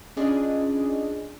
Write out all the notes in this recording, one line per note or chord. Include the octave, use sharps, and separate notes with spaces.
C#4 D4 F4 G#4 D5 D#5